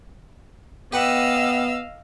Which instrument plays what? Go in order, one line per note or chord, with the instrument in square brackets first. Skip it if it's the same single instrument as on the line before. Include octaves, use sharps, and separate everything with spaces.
[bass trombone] B3 [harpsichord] G4 B4 F#5 [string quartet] D#5 F5 E6